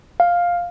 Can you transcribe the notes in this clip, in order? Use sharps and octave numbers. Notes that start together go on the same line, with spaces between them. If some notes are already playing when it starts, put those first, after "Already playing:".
F5